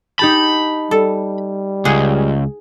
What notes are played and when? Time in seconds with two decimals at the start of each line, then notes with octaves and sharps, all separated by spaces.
0.19 D#4 G4 A5 B5
0.91 G3 A4
1.85 C#2 G#4 F#5